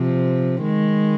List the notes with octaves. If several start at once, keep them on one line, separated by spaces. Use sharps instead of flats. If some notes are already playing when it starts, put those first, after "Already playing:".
Already playing: C3 F3
D#3 G#3